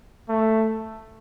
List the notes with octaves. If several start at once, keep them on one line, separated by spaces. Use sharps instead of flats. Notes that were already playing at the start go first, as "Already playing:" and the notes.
A3